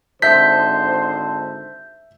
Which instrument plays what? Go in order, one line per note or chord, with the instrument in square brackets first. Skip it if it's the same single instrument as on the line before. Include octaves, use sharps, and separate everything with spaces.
[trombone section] G#1 D3 C5 [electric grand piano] E5 B6 [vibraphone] A5 [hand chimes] G6